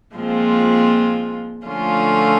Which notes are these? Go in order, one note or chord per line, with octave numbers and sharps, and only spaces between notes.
A#2 F3 G#3 C4 F4
D3 F3 A3 C#4 F4